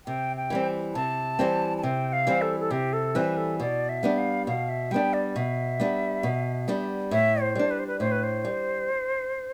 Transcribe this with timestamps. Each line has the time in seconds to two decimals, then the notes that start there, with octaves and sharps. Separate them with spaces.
0.06 C3 G5
0.37 G5
0.50 E3 G3 C4
0.94 C3 A5
1.39 E3 G3 C4
1.77 A5
1.83 C3 G5
2.13 F5
2.27 E3 G3 C4
2.42 A4
2.60 A4
2.71 C3 G4
2.93 A4
3.15 E3 G3 C4 B4
3.37 A4
3.59 B2 D5
3.89 E5
4.03 G3 B3 D4
4.18 F5
4.47 B2 F5
4.69 E5
4.91 G3 B3 D4 G5
5.13 D5
5.36 B2 E5
5.80 G3 B3 D4
6.23 B2
6.68 G3 B3 D4
7.11 A2 E5
7.41 C5
7.55 G3 D4
7.71 B4
7.79 C5
7.87 B4
8.00 A2 C5
8.12 B4
8.23 C5
8.45 G3